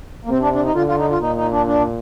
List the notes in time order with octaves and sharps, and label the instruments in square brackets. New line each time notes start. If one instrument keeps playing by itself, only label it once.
[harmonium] A#3
[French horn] C3 [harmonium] C4
[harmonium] D4
D4
D#4
[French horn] D3 [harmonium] F4
[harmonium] F4
D#4
F4
[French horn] A#2 [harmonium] D#4
[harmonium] D#4
D4
D4